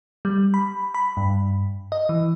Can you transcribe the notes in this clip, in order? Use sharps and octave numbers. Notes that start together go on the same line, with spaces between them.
G3
B5
B5
G2
D#5
E3